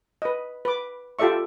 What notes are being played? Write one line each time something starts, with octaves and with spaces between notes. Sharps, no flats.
B4 D#5
B4 D6
F4 G4 A4 D5 E5 C#6